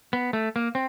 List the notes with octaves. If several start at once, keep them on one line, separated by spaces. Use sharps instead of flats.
B3
A3
A#3
C4